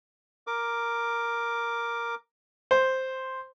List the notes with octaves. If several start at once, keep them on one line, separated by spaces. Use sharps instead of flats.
A#4 D6
C5